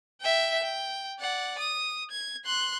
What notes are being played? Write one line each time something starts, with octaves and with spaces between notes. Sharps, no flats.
E5 G5
G5
D5 F#5
D#6
G#6
C6 F#6